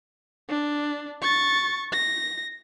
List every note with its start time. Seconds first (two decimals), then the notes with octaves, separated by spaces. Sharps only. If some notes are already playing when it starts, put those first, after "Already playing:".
0.49 D4
1.22 C#6 A6
1.92 A#6